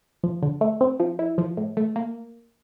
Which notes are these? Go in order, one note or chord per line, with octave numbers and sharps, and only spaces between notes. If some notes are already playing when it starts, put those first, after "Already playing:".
F3
D3
A3
C4
F3
E4
F3
A2
A3
A#3